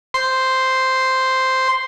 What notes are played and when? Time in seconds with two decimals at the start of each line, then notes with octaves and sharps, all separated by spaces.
0.14 C5 C6